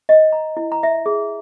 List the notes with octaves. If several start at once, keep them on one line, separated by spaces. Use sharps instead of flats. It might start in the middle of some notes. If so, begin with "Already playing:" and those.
D#5
A#5
E4
A#5
E5
G#4